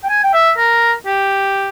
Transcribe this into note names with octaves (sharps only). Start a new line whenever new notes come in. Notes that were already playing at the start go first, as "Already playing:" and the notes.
G5
G#5
G5
E5
A#4
G4